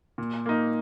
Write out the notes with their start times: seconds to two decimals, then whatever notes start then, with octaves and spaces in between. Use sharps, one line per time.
0.18 A#2
0.46 A#3 D#4